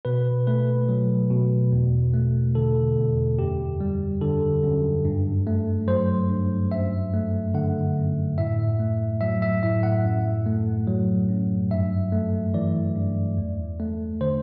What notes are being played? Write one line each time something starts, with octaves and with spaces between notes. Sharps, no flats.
B2 B4
A3 B4
F#3
B2
E2
A3
D3 A4
E2
F#2 G4
G3
D3 A4
F#2
G2
A3
F#3 C5
G2
F#2 E5
A3
D3 F#5
F#2
A2 E5
A3
F#3 E5
E5
A2 E5
F#5
F#2
A3
F#3
F#2
G2 E5
A3
E3 D5
G2
E2
A3
D3 C5